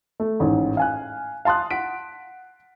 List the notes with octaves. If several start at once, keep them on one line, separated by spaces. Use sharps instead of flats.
A3
A1 G#2
F5 G#5 F#6
F5 A5 C6 D#6 F#6
F#5 B6 D7